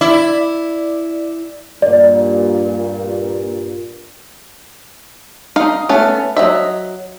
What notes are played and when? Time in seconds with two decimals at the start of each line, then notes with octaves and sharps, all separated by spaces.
0.01 E4 D5
1.82 G2 A#2 D5
5.56 D#4 D#5 F5
5.89 A3 B3 C#4
6.37 F#3 C4 D#5 E5